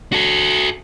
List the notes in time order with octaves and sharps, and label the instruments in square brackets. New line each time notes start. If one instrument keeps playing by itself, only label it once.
[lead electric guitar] F#4 A4